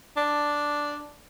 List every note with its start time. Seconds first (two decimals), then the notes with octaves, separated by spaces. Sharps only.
0.17 D4